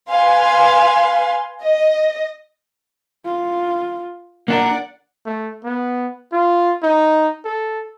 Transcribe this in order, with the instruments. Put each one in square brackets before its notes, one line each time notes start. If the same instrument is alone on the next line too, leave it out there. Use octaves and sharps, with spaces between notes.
[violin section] B4 F5 G#5 C6
D#5
[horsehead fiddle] F4
[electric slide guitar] A#3 D4 A#4 [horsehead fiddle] D5 F#5
[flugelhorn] A3
B3
F4
D#4
A4